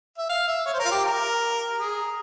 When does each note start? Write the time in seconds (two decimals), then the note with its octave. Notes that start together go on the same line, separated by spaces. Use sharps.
0.18 E5
0.29 F5
0.48 E5
0.66 C#5
0.73 C5
0.79 A#4
0.85 F4
0.92 G4
1.03 A#4
1.78 G#4